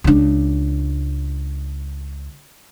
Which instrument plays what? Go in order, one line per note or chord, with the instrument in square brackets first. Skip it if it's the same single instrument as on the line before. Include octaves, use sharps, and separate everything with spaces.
[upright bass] C#2 D4